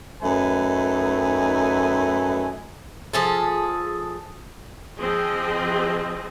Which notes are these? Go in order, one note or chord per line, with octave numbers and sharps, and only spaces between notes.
F#2 D#3 A3 D#4 B4 G#5
F3 G#4 A4
F3 C4 G#4 D#5